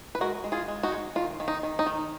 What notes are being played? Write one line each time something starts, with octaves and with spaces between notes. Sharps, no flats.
B4
G#3 F#4 A#4
G#3
F4 G#4
G#3
D#4 F#4
G#3
D#3 F4
D#3
D#4
D#3
D#4
D#3